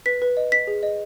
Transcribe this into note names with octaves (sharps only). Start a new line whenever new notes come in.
B4 B6
B4
D#5
D#5 B6
G#4
D#5